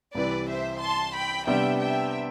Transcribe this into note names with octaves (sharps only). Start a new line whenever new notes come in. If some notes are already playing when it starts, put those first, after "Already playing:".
C2 C3 E3 B4 D5
C5 E5
A5 C6
G5 B5
C3 G3 B3 D4 E5 G5
E5 G5